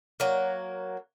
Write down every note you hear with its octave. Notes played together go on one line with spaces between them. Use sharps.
F#3 A#3